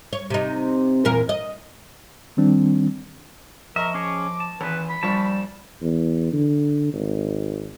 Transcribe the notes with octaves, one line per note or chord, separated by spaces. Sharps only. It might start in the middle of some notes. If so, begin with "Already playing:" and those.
C#5
C3 D#4
E2 A#2 A#4
D#5
D#3 G3 C4 D4
F3 A#4 D#5 E5 C#6
C#4 G#4 C#5 D6
A5
G#1 E3 B4
B5
A#1 F3 G3 A5 C#6
E2
D3
G#1